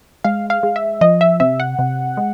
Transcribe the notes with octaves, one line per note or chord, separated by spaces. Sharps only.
G#3 F5
F5
G#3
E5
F3 D#5
E5
C3 E5
F#5
C3
G#3